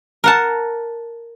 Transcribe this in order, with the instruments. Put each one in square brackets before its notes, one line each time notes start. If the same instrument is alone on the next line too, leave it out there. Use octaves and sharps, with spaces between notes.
[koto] A#4 F#5 A5